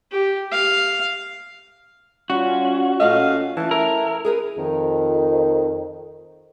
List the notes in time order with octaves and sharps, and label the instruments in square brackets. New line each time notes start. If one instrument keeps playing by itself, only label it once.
[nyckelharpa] G4
F5
[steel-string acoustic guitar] G3 [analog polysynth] C#4 F4 [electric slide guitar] F#4
[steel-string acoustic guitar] A#2 A3 D#5 [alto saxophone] F5
[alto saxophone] E3 [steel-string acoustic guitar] A3 A5
[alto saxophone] E4 [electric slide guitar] A#4
[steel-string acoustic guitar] G#4 A#4 B4
[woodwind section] F2 D#3